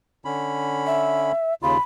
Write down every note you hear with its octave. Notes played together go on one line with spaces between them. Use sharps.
D3 C#4 B5
E5
D#2 C#3 F4 B5